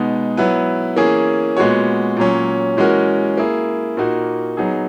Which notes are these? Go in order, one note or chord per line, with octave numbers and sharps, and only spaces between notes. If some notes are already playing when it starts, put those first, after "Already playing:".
Already playing: B2 G#3 B3 D#4
F#3 B3 E4 B4
E3 A#3 C#4 G#4
A#2 G#3 B3 F#4 C#5
A#2 F#3 C#4
E3 G#3 C#4 F#4 A#4
A#3 E4 G#4
A#2 A#3 D#4 F#4
F#3 B3 D#4 G#4